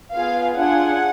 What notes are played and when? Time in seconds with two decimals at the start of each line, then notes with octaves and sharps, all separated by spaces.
0.14 B3 F4 G#4 F5
0.56 D4 F4 G#4 F#5